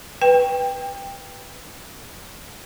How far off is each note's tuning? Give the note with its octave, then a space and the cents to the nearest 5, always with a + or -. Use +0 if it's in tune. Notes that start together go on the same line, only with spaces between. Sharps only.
B4 +0 G5 +15